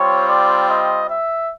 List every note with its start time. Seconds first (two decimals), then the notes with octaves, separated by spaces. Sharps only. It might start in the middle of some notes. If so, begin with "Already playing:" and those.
Already playing: G3 C4 F4 C#5
0.27 D5
0.68 D#5
1.08 E5